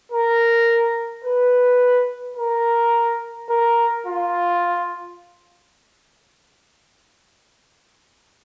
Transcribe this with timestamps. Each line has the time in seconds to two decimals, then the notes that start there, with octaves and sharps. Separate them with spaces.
0.12 A#4
1.24 B4
2.37 A#4
3.50 A#4
4.06 F4